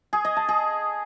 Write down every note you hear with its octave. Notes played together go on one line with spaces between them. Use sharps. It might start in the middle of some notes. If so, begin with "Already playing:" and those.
G#4
D#5
A5
G#4